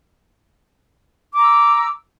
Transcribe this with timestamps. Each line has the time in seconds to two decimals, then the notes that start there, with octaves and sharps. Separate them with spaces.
1.33 D6
1.38 A#5
1.42 E6